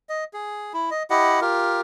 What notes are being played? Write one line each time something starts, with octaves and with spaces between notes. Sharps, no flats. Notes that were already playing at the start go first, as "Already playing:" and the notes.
D#5
G#4
E4
D#5
E4 G4 D#5 F#5
F4 G4 A#4